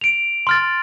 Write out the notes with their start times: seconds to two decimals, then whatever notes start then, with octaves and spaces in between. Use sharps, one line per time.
0.01 D7 F7
0.47 C6 F6 A6